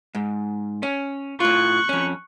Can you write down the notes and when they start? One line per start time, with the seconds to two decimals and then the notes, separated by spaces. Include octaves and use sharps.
0.15 G#2
0.83 C#4
1.40 A2 F4 C#6 F#6
1.89 F2 C#4